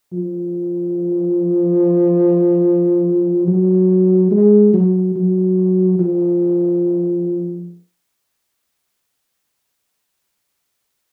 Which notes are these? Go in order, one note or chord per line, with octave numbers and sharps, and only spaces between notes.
F3
F#3
G#3
F#3
F#3
F3